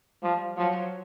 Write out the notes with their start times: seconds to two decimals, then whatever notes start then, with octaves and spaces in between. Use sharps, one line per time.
0.22 F3 G3
0.57 F3 F#3